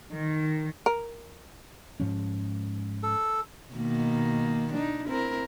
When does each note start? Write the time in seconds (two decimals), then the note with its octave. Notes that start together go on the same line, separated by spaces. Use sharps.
0.11 D#3
0.86 A#4
2.00 G#2 F3 C#4
3.03 A4
3.74 B2 D#3 A#3
4.74 D4 D#4
5.08 C4 E4 A#4